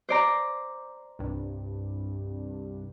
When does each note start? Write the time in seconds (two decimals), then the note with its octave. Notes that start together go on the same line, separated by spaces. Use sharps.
0.09 C5 D5 A#5
1.19 C2 G2